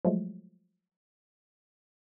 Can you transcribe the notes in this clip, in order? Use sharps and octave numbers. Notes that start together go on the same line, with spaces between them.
F3 F#3 G#3 A3